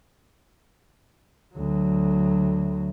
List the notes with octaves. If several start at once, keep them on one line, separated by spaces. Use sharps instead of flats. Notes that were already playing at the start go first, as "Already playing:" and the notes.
D2 F#3